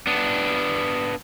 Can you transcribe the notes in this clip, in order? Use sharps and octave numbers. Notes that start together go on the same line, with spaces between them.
B3 D4